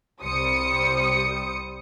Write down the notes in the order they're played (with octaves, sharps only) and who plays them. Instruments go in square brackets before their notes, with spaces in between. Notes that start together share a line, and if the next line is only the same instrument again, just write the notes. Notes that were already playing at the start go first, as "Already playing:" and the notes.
[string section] C2 G3 C5 D#6 C#7